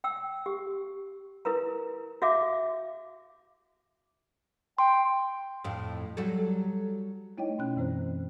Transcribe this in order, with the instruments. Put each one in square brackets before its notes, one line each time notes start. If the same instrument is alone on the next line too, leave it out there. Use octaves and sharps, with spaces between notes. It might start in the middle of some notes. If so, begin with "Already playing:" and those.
[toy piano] G5 E6
G4
E4 A#4 B4 A#5
F#4 E5 F5 D6
[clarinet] G5 [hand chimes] C6
[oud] F2 A2
F#3 G3 A4
[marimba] A3 D#4 E4 C#5 D#5 G5
B2 C#4 F#6
F#2 E3 C4 C5